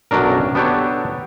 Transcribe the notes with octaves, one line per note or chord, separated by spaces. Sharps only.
B1 F#2 F#3 D4 A#4
B3 D4 G4 A4 C#5